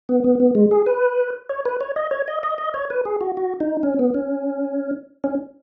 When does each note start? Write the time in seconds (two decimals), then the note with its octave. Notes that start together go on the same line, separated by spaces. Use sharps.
0.09 B3
0.24 B3
0.40 B3
0.55 G#3
0.71 G#4
0.86 B4
1.49 C#5
1.65 B4
1.81 C#5
1.96 D#5
2.11 C#5
2.28 D#5
2.43 D#5
2.58 D#5
2.74 C#5
2.90 B4
3.05 G#4
3.21 F#4
3.37 F#4
3.60 D#4
3.83 C#4
3.99 B3
4.14 C#4
5.24 C#4